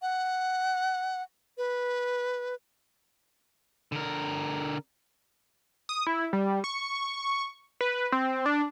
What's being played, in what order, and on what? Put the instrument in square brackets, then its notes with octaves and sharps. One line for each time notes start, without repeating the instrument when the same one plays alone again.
[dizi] F#5
B4
[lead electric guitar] D3 A#4
[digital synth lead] D#6
E4
G3
C#6
B4
C4
D4